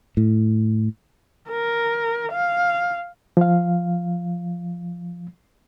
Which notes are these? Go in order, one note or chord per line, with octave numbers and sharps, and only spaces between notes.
A2
A#4
F5
F3 F5